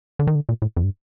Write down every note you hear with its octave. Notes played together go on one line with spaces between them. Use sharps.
D3
D#3
D3
A#2
A2
F2
G2